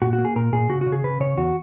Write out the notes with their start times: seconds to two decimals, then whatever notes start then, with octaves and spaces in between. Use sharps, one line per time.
0.02 A#2 F#4
0.13 F#4
0.18 A#3
0.25 G#4
0.36 A#2 A#4
0.53 A#2 G#4
0.69 C#3 F#4
0.81 F#4
0.86 C#3
0.92 G#4
1.04 C#3 B4
1.20 C#3 C#5
1.37 E2 F#4